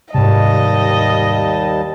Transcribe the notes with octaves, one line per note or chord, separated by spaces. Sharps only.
D#2 G#2 C3 G3 D#5 A5